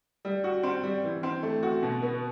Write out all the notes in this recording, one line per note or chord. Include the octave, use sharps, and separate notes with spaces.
G3
F#4
C4
G3
E3
C4
A3
F#4
B2
B3